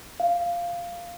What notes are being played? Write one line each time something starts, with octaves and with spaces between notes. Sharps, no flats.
F5